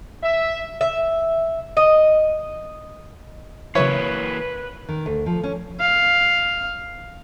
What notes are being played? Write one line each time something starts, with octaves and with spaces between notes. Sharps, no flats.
E5
E5
D#5
C#3 E3 F#3 A#3 B4 C#5 E5
D#3
D2
F3
C#4
F5